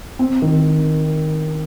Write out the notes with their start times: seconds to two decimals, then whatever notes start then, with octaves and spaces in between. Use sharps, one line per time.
0.19 C4
0.42 D#3